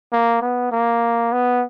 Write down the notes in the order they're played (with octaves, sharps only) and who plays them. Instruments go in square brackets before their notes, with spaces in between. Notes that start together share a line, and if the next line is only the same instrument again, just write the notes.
[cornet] A#3
B3
A#3
B3